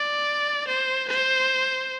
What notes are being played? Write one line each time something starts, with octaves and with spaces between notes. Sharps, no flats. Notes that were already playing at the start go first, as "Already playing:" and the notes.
Already playing: D5
C5
C5